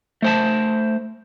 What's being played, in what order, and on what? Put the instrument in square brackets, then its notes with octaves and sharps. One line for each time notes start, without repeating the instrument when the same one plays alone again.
[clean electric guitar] A3 C5 A5